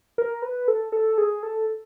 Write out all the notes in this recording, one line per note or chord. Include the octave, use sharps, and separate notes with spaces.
A#4
B4
A4
A4
G#4
A4